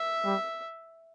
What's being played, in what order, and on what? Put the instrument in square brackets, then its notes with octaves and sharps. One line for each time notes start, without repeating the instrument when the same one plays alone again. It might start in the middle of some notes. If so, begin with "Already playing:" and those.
Already playing: [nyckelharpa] E5
[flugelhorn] G3